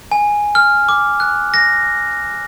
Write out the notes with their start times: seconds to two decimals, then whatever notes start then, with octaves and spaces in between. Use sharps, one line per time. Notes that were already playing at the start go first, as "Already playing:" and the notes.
0.12 G#5
0.55 F6
0.89 D6
1.20 F#6
1.54 A#6